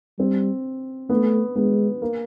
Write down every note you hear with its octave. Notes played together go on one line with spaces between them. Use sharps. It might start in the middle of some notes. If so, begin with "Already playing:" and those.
G3 C4
A3 B3
G#3 B3
A#3